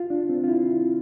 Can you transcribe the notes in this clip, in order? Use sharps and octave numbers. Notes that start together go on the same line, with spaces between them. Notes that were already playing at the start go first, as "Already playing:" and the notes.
Already playing: F4
D4
C4
F4
E4